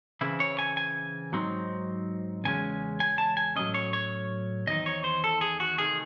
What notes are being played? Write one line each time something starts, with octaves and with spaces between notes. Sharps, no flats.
C#3 E3 C4 E4
C#5
G#5
G#5
G#2 F#3 C4 D#4
E2 C#3 G#3 C#4 G#5
G#5
A5
G#5
A2 F#3 A3 C#4 D#5
C#5
C#5
E2 D#3 C4 D#4 D#5
C#5
C5
A4
G#4
F#4
C3 D#3 A3 G#4